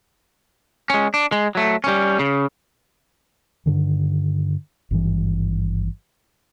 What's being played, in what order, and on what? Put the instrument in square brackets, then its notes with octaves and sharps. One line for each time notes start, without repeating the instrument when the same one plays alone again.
[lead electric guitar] G#3 C#4
D4
G#3
F#3 A3
G3 C#4
C#3
[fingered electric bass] G2 D3 D#3
G#1 G2 E3